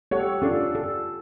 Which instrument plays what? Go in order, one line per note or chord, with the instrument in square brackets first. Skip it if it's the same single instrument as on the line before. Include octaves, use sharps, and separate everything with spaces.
[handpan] G4 A4 F#5 [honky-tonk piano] C#5
[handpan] C#4 A4 [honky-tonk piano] D4 F4
[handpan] A4